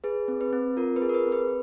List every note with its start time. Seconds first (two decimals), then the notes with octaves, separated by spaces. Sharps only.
0.04 G#4 B4
0.28 C4
0.41 B4
0.53 C4
0.77 F4 A#4
0.96 B4
1.02 G#4
1.09 A#4
1.14 B4
1.26 C4
1.32 B4